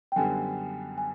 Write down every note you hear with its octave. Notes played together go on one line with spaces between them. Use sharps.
G5
F#2 D3 G3 B3 G#5
G#5